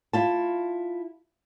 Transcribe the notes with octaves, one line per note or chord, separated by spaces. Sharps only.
E4 F4 A5